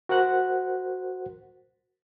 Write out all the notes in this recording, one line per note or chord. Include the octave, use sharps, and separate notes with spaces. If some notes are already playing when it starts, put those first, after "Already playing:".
F#4 A#4 C5 F#5 F#6